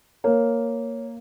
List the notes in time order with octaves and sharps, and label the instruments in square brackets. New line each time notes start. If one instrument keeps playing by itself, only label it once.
[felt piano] A#3 [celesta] C#5